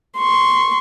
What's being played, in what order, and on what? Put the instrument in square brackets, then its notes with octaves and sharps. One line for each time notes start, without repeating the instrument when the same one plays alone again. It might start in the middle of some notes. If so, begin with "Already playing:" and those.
[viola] C6 C#6